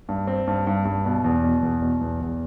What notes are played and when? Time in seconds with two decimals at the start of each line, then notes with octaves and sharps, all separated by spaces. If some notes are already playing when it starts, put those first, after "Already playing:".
0.09 G2
0.27 C4
0.47 G2
0.67 G2
0.85 G2
1.05 B2
1.24 E2
1.44 B2
1.63 E2
1.82 B2
2.01 E2
2.21 E2